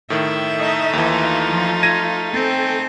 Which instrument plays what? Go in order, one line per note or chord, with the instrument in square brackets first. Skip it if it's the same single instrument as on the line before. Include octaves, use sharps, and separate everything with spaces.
[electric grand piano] A2 D#3 [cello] E5
[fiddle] A3 D#4 [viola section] D#5
[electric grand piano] D#2 E3 [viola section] F4 F5 C6
[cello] F3
[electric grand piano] G#6 A#6 D#7
[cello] C4 [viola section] A4 G5 G#5